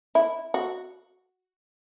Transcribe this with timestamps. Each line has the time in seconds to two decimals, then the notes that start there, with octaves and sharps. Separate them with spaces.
0.15 E4
0.54 F#4